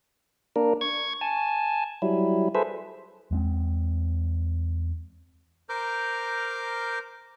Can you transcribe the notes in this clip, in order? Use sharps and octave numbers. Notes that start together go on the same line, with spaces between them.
A#3 D4 A#4
C#6 G#6
G#5 A5
F#3 G3 E4
G#4 A4 B4 C5 E5
E2 G#3 C4
A#4 C5 A#5 D6 F6 G6